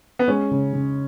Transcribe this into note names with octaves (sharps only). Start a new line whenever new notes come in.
B3
G#3 C#4
C#3
C#3